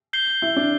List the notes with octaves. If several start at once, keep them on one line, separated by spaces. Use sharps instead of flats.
G6 C7 G7
E4
D4